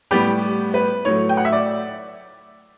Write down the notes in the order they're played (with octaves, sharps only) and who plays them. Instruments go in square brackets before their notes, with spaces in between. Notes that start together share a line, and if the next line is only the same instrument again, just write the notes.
[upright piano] A2 G3 B3 G4
B4
A2 F#3 A3 C#5
G5
F#5
E5
D5